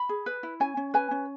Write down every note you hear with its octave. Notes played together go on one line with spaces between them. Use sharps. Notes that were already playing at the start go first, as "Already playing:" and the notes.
Already playing: B5
G#4
B4
E4
C#4 G#5
C#4
B4 G#5
C#4